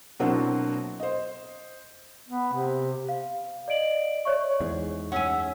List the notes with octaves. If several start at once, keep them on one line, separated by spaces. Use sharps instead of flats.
B2 F#3 A#3 C4 D4 E4
C5 D#5
B3
C3
F5
D5 D#5 D7 F#7
C#5 D5 E5 C#6
E2 G#2 G#4
C#4 E5 F#5 G#5